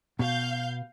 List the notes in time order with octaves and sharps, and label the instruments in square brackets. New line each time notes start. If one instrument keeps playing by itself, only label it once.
[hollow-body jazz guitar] B2 [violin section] F5 G6